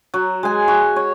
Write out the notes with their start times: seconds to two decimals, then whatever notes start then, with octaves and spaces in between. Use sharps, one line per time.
0.14 F#3
0.43 G#3 G#5
0.68 F#4
0.96 C#5